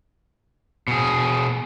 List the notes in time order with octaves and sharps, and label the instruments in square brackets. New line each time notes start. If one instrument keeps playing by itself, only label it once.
[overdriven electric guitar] B2 G#4